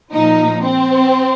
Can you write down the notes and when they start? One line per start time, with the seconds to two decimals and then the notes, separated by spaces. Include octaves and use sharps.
0.13 A#2 F3 D#4
0.63 C4